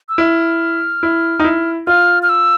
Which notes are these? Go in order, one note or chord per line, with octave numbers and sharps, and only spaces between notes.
E6
E4 F6
E4
D#4
E4
F4 F6
F6
E6